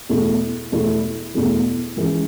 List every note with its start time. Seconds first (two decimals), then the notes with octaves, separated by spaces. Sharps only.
0.09 E2 B2 A3 E4
0.72 E2 B2 A3 E4
1.34 E2 B2 A3 E4
1.96 G#2 E3 G#3 C#4 E4